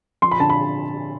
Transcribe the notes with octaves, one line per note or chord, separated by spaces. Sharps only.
F3 C6
B5
D3 A5
B5